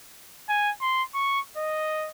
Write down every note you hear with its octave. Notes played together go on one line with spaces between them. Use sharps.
G#5
C6
C#6
D#5